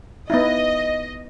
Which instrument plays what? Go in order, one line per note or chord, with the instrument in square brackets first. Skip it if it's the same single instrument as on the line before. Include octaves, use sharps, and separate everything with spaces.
[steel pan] B3 D#4 E4 [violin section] D#5